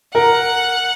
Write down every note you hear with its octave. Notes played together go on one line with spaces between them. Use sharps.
A#4 F#5